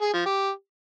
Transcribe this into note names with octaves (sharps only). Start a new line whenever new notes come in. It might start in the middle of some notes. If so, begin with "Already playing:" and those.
G#4
F3
G4